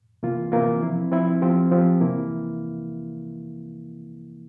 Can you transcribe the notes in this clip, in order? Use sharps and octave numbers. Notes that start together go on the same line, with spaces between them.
C3 E3 A#3 F4
C3 E3 A#3 F4
F3 C4 E4
F3 C4 E4
F3 C4 G4
F3 C4 G4
C3 E3 A#3 E4